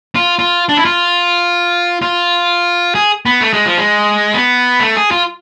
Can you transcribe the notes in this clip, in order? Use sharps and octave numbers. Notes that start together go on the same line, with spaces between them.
F4
F4
D4
E4
F4
F4
G#4
B3
A3
G#3
F3
G#3
B3
A3
G#4
F4